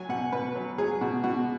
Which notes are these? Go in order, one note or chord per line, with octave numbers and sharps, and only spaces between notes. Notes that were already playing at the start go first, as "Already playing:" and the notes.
Already playing: F#3 G#5
B2 F#5
B2 B4
F#3
F#3 G#4
B2 F#4
B2 F#4